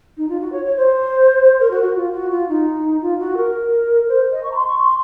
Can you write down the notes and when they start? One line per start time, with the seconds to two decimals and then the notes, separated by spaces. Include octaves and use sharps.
0.17 D#4
0.29 F4
0.40 F#4
0.52 C#5
0.65 C#5
0.76 C5
1.59 A#4
1.71 F#4
1.82 F#4
1.95 F4
2.12 F#4
2.30 F4
2.48 D#4
3.01 F4
3.19 F#4
3.37 A#4
4.08 C5
4.32 D#5
4.43 C#6
4.51 A#5
4.55 C6
4.67 C#6
4.79 C6